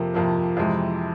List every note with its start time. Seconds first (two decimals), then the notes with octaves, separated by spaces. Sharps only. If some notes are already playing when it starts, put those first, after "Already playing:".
Already playing: F2 C3 F3 A#3
0.14 F2 C3 F3 A#3
0.57 F2 C3 E3 G#3